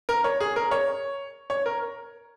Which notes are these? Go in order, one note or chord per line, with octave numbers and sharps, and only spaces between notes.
A#4
C#5
G#4
A#4
C#5
C#5
A#4